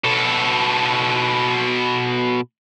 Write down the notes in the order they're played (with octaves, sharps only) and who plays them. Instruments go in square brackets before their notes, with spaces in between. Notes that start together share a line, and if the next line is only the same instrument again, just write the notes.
[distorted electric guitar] B2 A4